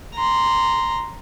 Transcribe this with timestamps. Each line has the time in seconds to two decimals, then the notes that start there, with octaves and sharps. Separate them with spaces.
0.14 A#5 C6